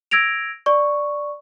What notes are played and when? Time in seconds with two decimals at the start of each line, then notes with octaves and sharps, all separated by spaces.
0.11 E6 G#6 A#6 D7 F7
0.66 D5 C#6